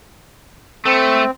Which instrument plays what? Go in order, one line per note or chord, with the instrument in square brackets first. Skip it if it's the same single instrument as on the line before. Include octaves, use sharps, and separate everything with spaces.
[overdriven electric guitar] A3 [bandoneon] C4